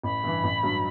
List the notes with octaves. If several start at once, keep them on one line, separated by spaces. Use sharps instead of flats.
A1 B5
G2 E3
A1
G2 F#3